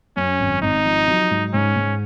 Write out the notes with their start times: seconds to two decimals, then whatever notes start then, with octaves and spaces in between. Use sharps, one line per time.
0.17 F#2 C#4
0.39 G#1
0.62 G#1 D#4
0.85 F3
1.07 F#3
1.31 G#2
1.53 G#2 C#4
1.76 G#2